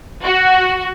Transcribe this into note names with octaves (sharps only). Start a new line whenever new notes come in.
F#4